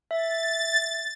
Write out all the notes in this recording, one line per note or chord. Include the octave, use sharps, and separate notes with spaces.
E5 A6